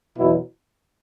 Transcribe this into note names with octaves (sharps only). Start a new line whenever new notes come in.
E2 B2 F#3 E4